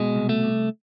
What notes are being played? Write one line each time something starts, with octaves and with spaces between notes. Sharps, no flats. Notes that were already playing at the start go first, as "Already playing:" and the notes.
Already playing: B2 G#3
C2
A3
C2